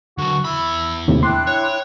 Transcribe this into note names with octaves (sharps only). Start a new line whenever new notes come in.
D3 F#3 F#4
E2 E4 B5
D#2 A2 C3
D4 E4 G5 C6 F#6
C#5